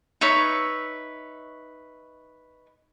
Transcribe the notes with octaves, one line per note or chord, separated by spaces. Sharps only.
D#4 B4 C#5 E5